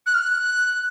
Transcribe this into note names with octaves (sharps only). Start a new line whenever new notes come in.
F#6
F6
F#6